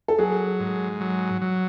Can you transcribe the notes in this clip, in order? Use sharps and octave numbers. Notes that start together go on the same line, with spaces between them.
A4
F#3 G#4
G#2
F#3
F#3